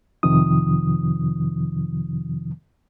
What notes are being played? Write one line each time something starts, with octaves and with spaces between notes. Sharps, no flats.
F2 C3 D#3 F3 D#6